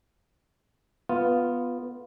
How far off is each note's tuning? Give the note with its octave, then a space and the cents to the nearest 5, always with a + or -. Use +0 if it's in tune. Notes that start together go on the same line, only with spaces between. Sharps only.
B3 +0 F4 +0